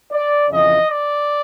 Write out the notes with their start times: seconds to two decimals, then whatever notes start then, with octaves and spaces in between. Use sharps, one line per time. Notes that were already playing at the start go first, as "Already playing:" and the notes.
0.12 D5
0.50 F2 C#3 E3 D#5
0.90 D5